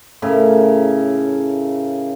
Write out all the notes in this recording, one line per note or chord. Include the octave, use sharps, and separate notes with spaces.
A2 C#3 A#4 E5